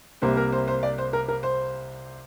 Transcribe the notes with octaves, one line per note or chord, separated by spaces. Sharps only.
C2 C3 G3 A#3 C5
A#4
C5
C5
D5
C5
A#4
A#4
C5